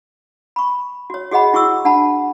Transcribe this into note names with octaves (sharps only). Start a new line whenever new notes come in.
B5 C#6
F#4 C#5
F#4 G#4 D#5 F#5 B5
E4 F#4 G#4 C#6 D6 E6
D4 F#5 A5 B5